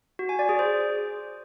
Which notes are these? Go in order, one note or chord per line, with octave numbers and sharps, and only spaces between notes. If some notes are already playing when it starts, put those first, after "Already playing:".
F#4
G#5
D5
G#4
C5